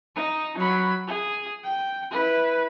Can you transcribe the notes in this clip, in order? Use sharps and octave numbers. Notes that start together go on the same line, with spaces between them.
D#4
F#3 B5
G#4
G5
E4 B4